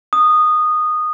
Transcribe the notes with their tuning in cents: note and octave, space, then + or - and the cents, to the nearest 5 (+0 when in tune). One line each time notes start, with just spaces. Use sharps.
D#6 -15